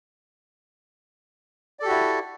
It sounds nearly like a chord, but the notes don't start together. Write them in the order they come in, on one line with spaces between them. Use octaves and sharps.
D5 A4 G4 F#4 E4